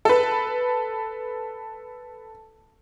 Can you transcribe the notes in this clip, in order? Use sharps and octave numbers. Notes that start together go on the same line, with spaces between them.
A4 B4